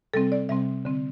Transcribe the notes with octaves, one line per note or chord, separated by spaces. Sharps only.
C3 G3 C4 A4
D5
C3 G3 C4 E5
D3 C4